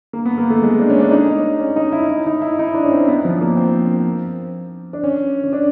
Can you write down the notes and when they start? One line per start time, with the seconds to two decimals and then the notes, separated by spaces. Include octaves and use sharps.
0.13 A#3
0.26 B3
0.38 A#3
0.50 A3
0.62 G#3
0.79 D4
0.90 C#4
1.00 D4
1.11 D#4
1.60 C#4
1.76 D#4
1.93 E4
2.10 E4
2.26 D#4
2.42 E4
2.59 D#4
2.74 D4
2.85 C#4
2.91 C4
3.08 B3
3.25 F3
3.41 A#3
3.57 C4
4.93 D4
5.04 C#4
5.44 C#4
5.53 D4